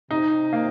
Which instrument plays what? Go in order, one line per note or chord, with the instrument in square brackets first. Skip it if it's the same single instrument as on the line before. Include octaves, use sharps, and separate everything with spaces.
[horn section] C3 [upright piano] D#4
[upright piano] A#3